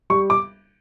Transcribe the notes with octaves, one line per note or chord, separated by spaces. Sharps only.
G3 C#6
D6